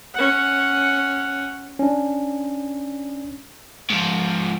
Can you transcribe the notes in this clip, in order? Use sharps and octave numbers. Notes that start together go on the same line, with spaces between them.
C#4 F#5
C#4 D4
G#2 F3